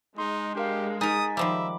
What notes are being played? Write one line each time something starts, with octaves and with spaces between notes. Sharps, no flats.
G#3 D#4 C6
D4 G4 A#4 F5
D#4 A#4 G#5 D#6 A6 B6
D#3 F3 G3 E5 B5 D6